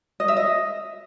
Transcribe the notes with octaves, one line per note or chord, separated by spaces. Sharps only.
D#5
E5
D#5